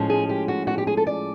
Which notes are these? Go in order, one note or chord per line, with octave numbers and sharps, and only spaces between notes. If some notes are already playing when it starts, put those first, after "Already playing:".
Already playing: A2 F3 G#3 C#4
G#4
G4
F#4
F#4
G4
G#4
A4
D5